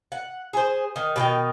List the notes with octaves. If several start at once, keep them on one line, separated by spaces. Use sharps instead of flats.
F#5
G#4 C5
D#3
B2 D#3 G5